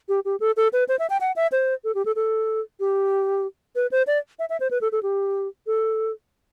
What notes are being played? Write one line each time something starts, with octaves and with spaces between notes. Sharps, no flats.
G4
G4
A4
A4
B4
C5
E5
G5
F#5
E5
C5
A4
G4
A4
A4
G4
B4
C5
D5
E5
E5
C5
B4
A4
A4
G4
A4